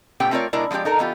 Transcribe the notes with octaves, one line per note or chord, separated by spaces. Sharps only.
A#2 A3 B3 C#4 G4 G5
A3 C4 F4 A#4 C#5 D5
B2 G#3 D4 E4 A#4 D5
F3 G#3 F#4 G4 D5
D#4 A4 A#4
E3 B3 F4 G4